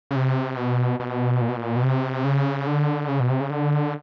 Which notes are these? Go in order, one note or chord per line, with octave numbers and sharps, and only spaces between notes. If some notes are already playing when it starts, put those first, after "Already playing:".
C#3
C3
B2
B2
A#2
B2
A#2
B2
C3
C#3
D3
C#3
B2
C3
C#3
D3